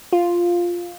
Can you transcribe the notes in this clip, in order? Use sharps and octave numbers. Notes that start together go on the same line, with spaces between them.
F4